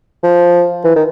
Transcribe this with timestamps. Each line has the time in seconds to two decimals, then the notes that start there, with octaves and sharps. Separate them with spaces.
0.23 F3
0.84 E3
0.95 D#3